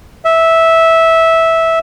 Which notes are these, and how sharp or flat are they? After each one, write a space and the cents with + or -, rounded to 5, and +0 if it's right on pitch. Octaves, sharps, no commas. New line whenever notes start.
E5 -10